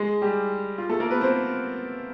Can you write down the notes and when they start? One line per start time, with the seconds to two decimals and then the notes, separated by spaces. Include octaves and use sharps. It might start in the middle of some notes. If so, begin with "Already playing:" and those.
Already playing: G#3 G#4
0.22 G3 G4
0.78 F4
0.89 A3 A4
1.00 A#3 A#4
1.10 B3 B4
1.21 C4 C5